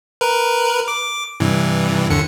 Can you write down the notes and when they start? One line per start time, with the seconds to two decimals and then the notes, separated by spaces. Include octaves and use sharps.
0.21 A#4 B4
0.88 D6
1.40 G2 C3 E3
2.10 D#2 D3 C#7